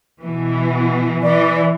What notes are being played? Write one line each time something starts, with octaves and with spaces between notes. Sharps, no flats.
B2 E3
E3 D5